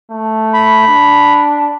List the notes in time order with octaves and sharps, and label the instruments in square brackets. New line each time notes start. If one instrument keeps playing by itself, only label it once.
[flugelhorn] A3
[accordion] B5
[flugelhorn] D4